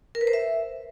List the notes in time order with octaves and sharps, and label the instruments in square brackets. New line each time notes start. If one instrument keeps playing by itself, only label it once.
[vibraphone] A#4
B4
C5
E5